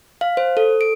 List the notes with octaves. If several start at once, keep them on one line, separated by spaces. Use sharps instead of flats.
F5
C5
A4
D7